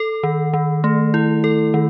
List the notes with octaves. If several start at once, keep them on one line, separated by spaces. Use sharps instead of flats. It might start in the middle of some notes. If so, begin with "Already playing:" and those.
Already playing: A4
D#3
D#3
A3
E4
A4
D#3